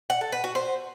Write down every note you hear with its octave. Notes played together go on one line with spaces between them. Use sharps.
F#5
A4
B4
F#4
C5